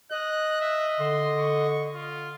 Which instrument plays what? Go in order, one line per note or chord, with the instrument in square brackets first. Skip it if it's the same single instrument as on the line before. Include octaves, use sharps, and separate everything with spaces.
[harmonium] D#5 [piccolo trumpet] F#6
[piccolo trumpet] E5
[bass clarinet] D3 [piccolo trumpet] C6
[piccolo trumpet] C#6
F4